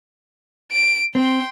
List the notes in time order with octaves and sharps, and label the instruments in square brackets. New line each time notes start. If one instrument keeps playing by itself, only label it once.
[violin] D7
[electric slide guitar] C4 [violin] G5 C6